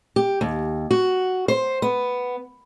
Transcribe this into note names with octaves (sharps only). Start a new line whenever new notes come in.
G4
D#2
F#4
C5
B3